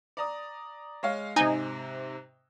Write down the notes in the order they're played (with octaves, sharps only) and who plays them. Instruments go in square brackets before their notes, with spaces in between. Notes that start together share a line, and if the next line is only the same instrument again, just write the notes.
[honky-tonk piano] D5 A#5 D#6
G#3 C#5 F5
[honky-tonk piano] G#2 C3 [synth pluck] D#4 G#5